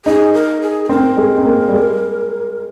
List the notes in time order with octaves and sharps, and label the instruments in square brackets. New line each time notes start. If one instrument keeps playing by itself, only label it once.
[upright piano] D#4 [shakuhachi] G#4
[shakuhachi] A#4
G#4
G#4
[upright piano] C4 [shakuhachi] A#4
[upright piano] G#3
C4
A#3
G3
G#3